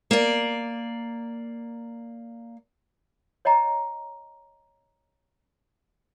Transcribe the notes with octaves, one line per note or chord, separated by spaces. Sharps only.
A#3 D5
C#5 D#5 G5 A#5